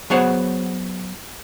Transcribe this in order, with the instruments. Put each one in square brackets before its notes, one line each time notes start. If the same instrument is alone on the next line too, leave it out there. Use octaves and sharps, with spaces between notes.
[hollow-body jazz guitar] F#3 B3 G#4 C5 C#5 F#5